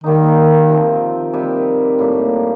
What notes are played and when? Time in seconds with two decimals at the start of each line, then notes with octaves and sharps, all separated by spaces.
0.04 D#3 G3 A#3 D#4
0.69 C3 F3 C4
1.33 C3 D#3 G3
1.99 A2 G3 A#3